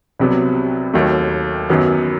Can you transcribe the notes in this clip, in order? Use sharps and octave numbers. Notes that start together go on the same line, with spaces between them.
C2 C3 F#3 B3
D#2 D#3 F#3 A3
F#2 D#3 F#3 B3